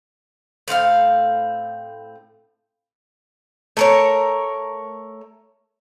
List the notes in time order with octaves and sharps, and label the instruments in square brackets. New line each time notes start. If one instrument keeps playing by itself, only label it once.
[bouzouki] A2 C4 F4 F5
A3 A#4 C#5